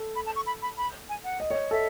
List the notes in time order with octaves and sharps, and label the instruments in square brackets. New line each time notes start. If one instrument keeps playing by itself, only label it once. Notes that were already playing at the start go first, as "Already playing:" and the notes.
Already playing: [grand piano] A4
[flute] B5
A5
C#6
B5
B5
B5
G#5
F#5
[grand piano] D#5
C#5
[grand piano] A4 [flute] E5